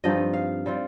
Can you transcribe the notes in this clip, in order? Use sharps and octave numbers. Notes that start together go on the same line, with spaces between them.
G2 F3 C4 D#4 D#5
F5
G3 C4 F4